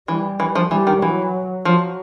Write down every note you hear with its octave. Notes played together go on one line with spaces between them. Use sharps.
E3 G3
E3
F3
E3 G3
D#3
E3 F#3
F3 F#3